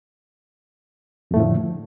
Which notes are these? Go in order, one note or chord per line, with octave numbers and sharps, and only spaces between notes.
F2 A2 D3 F3 A3